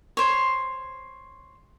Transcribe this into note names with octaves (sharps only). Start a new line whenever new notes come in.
C5 C#5